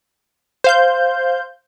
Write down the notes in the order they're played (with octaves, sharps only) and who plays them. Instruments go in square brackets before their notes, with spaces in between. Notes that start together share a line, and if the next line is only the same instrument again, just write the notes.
[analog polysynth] C5 F5 G6